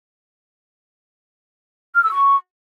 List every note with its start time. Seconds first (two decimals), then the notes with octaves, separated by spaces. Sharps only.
1.95 F6
2.03 E6
2.12 C#6